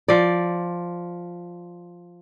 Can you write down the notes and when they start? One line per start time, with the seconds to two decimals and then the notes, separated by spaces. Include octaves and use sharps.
0.08 F3 D5